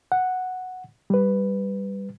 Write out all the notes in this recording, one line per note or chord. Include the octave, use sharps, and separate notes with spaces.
F#5
G3 B4